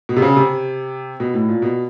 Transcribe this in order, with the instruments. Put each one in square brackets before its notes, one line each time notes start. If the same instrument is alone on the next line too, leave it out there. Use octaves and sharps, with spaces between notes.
[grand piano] B2
C3
C#3
C3
B2
A2
A#2
B2